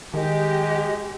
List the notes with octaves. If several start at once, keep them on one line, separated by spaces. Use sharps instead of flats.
D#3 G#3 G4 D#5